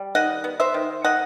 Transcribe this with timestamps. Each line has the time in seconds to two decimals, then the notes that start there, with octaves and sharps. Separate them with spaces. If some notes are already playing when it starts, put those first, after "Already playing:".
Already playing: G3
0.15 D#3 D#5 F#5
0.44 B3
0.60 C5 E5
0.74 D#3
1.04 D#3 D#5 F#5